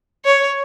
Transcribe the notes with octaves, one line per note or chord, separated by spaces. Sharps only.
C#5